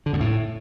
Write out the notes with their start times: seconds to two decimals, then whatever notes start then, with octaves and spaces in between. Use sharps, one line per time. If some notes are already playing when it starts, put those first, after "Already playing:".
0.06 D3
0.13 F#2
0.20 A2